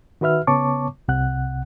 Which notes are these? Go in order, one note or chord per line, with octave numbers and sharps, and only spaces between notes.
D#3 F#4 B4 E5 F6
C#3 B3 C#5 A5 C#6 D6
C2 C3 F#5 F#6